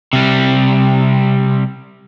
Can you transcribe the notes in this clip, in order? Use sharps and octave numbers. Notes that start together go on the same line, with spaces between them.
C3 G3